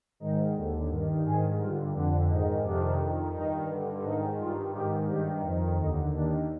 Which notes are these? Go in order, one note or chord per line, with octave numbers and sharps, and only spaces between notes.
G#2 D#3 D#4
D#2 D3
G2 D#3
G#2 D#3 G#4
G2 D3 F4
F2 D3 D4
G#2 D#3 D#4
F2 C3 D#3 D4
F2 D#3
G2 D#3 D#4
G2 D3
G#2 D#3 D#4
G2 D#3 F4
G#2 D#3 G4
G2 D#3 G4
F2 D#3
D#2 D3 D#4
D#2 D#3 D4